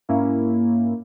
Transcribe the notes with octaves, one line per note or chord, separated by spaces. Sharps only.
G#2 A#3 C#4 E4